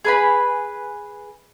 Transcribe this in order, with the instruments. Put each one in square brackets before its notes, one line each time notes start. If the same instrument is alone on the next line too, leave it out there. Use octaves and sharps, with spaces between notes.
[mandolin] G#4 B4 B5